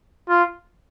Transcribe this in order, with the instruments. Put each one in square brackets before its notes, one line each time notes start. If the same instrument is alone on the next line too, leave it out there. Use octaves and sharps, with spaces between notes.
[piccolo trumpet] F4